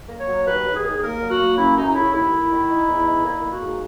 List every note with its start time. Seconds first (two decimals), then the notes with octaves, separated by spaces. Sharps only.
0.09 A#3
0.18 C#5
0.27 F#3
0.46 D#2 B4
0.65 D#2
0.74 G#4
0.84 D#2
1.02 A#3 A#4
1.21 F#3
1.29 F#4
1.39 A#3
1.57 F#2 E4
1.76 F#2 D#4
1.88 D#4
1.94 C#3 E4
2.13 D#2 E4
2.32 D#2
2.50 D#3
2.68 D#4
2.87 E2
3.05 D#4
3.24 A#3 E4
3.42 A#3
3.52 F#4
3.61 G#2